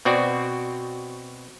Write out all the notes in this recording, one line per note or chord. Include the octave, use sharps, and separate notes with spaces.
B2 C4 F#4 D5